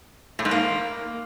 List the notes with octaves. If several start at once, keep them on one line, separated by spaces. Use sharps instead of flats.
A2
G#2
A#3